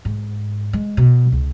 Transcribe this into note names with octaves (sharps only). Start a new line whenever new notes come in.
G#2
G#3
B2
C#2